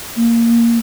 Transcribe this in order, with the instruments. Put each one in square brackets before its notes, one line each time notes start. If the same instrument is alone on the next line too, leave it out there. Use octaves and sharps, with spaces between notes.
[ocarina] A#3